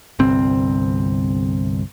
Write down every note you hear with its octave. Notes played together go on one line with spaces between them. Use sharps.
G1 C2 C4